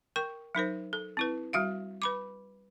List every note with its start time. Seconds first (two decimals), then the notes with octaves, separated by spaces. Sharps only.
0.16 A#4 G5 C#6
0.55 F#3 D#4 A#4 C5
0.93 A4
1.17 C4 E4 B4
1.53 G3 F#4 E5 F5
2.02 B4 B5 D6